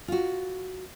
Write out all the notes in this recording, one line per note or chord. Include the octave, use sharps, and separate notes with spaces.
F4 F#4